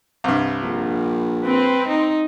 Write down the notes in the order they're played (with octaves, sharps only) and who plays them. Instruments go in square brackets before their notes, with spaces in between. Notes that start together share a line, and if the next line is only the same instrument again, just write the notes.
[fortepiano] C2 G2
[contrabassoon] A#1
[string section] C4 [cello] B4
[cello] D#4